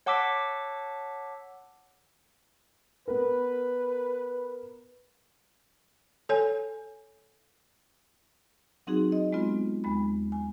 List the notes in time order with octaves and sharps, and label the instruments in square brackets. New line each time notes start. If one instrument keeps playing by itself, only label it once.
[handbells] C#5 F#5 A5 D6 E6 B6
[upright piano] B3 A#4 [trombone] B4
[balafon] A4 C#5 G#5
[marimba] F#3 C4 D#4 F#4 G#4
D#5
G#3 B3 C4 F4
D#2 G#3 B5
G#5